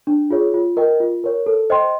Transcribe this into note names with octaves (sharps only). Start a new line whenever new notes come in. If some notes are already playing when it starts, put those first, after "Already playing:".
D4
F4 G#4 C#5
F4
A#4 D#5 G5
F4
A#4 C#5
A4
C5 D#5 G5 C6